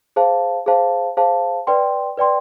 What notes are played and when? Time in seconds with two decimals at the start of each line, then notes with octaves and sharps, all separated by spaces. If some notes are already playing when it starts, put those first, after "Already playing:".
0.16 G#4 C5 F5 A5
0.66 G#4 C5 F5 A5
1.17 G#4 C5 F5 A5
1.67 B4 D5 G5 C6
2.18 B4 D5 G5 C6